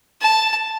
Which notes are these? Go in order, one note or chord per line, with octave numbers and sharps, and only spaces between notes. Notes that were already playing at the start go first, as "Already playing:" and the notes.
A5